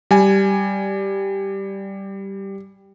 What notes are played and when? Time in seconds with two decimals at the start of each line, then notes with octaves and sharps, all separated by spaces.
0.11 G3 G#5